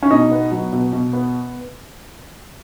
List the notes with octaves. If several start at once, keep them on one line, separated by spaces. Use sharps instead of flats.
C#4
B2 D#4
B3
F#3
B2
B2
B3